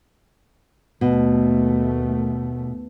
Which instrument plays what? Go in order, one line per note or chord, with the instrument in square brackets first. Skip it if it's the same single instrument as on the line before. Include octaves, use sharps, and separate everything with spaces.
[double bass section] D#2 A3 [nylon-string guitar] B2